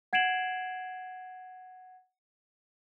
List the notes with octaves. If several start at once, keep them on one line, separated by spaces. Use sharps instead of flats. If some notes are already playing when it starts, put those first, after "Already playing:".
F#5 G#6 C7 D7 E7 F#7